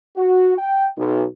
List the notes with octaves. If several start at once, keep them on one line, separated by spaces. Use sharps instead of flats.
F#4
G5
B1